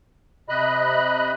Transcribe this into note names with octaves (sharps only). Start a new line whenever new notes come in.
C3 D#5 B5 F#6